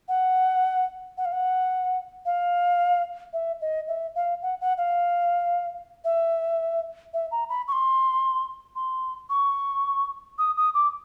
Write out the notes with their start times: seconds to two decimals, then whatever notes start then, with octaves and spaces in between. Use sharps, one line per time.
0.08 F#5
1.17 F#5
1.25 F5
1.32 F#5
2.25 F5
3.33 E5
3.61 D#5
3.88 E5
4.15 F5
4.42 F#5
4.60 F#5
4.78 F5
6.04 E5
7.14 E5
7.31 A#5
7.49 B5
7.68 C#6
7.72 C6
8.76 C6
9.30 C#6
10.38 D#6
10.57 D#6
10.74 D6